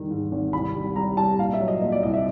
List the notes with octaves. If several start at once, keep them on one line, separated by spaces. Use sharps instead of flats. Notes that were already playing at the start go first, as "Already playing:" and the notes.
Already playing: E2 D#3 G3
G#2
G#1
C2 B5
G3
G3 A#5
G3 A5
A#2 F5
E5
F#3
D#5
A#2 D#5
D5
C2 D#5
E5